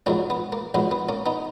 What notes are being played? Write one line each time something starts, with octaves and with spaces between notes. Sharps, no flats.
A#1 G#2 F#3 A#3 C#4
B3
A#3
A#1 G#2 F#3 B3
B3
A#3 C#4
B3 D#4